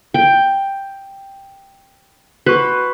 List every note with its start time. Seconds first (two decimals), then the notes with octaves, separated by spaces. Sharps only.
0.14 G5
2.46 F#4 B4 C#6